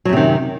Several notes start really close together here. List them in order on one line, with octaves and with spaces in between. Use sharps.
F#3 F#2 C3 D#3